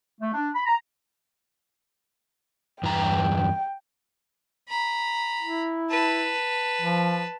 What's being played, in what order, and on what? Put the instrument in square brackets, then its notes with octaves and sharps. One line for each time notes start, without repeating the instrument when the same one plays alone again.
[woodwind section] A3
D4
B5
A#5
[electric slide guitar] E2 G2 A#5 [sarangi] G5
[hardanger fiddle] A#5 B5
[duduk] E4
[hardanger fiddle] B4 A5
[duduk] F3